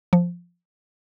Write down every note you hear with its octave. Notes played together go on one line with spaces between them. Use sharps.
F3